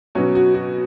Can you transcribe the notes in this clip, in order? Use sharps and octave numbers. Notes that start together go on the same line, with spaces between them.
B2 F#3 C#4 F#4
F#4
F#4